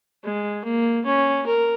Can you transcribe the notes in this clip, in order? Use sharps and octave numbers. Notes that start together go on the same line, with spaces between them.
G#3
A#3
C#4
A#4